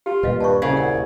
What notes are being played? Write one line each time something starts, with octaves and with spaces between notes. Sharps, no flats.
F4 G4
D#1 A#2 B4 D#5 F5
G2 A5 C#6
C2 C#3 F5
A#4 F#5